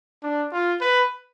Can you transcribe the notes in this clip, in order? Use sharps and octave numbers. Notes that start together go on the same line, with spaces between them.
D4
F4
B4